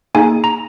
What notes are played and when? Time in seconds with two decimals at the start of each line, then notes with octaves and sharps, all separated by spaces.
0.15 A#3 D#4 G#4 G#5
0.44 A#5